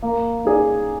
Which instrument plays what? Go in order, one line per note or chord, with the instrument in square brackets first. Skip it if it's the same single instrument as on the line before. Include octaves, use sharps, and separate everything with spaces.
[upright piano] A#3
D#4 G#4 D5